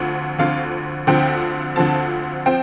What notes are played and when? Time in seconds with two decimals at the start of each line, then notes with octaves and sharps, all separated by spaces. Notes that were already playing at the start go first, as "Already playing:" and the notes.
Already playing: D2 D3 F3 C4
0.38 D2 D3 F3 C4 F5
1.07 D2 D3 F3 C4 G5
1.76 D2 D3 F3 C4 A5
2.46 F3 C4 G5